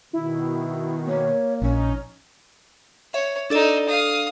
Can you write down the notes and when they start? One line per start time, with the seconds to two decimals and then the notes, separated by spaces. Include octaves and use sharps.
0.13 B2 D#3 E4
1.07 A#3 C#5
1.62 A#1 C#4 D#4
3.14 C#5 E5
3.50 D4 D#4 A4 D5 E6
3.88 F5 D#6